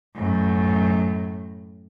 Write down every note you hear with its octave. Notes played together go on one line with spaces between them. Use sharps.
F#2 A2